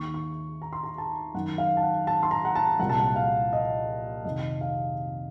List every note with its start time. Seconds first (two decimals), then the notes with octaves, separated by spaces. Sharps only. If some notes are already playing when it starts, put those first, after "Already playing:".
Already playing: D#2 D#3 C#6
0.14 C#6
0.62 A#5
0.73 C6
0.83 A#5
0.98 A5
1.34 F#2 D#3 F#5
1.58 F5
1.77 A5
1.82 F#5
2.07 A5
2.23 C6
2.31 A#5
2.45 F#5
2.55 A5
2.79 C2 A#2 F3 F#5
2.89 A5
3.00 F#5
3.16 F5
3.53 D#5
4.25 F2 C3 D#3 D#5
4.61 F5